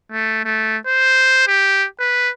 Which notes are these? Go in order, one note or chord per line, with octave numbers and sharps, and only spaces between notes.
A3
A3
C5
G4
B4